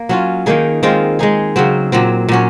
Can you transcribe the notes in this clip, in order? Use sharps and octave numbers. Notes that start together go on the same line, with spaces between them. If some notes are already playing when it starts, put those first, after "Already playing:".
Already playing: A#3
F#3 C#4 F4
D#3 A#3 D#4 G#4
D#3 G#3 C4 F4
G#3 D#4 G#4
C#3 F#3 C4
A#2 F#3 C4
A#2 F#3 C#4